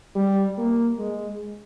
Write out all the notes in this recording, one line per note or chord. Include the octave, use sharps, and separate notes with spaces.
G3
A#3
G#3